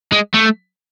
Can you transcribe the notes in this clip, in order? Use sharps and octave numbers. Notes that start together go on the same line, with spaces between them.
G#3
A3